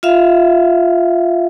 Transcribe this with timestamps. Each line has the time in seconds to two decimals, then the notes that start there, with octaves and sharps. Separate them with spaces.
0.03 F4 E5 F5